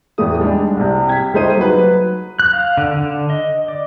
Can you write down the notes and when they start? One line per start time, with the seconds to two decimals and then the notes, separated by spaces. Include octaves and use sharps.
0.18 E2 A2 E3 A3 G4 D#6
0.41 G3 G#3 D4
0.76 C2 C3
1.07 G5 G#6 B6
1.33 C#2 G3 A3 D#4 C5 D#7
1.57 F#3 B4
2.39 F#6
2.53 F5
2.77 D3
2.97 D3
3.30 D#5
3.68 D5